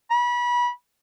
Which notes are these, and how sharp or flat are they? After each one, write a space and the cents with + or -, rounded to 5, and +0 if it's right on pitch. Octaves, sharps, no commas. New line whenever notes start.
B5 -30